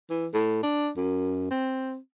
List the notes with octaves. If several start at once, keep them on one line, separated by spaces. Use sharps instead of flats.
E3
A2
D4
F#2
C4